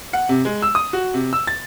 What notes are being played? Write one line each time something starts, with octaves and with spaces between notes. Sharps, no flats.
F#5
C3
G#3
E6
D#6
F#4
C3
E6
A6